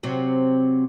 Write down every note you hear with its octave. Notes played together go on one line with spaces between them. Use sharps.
C3 F#3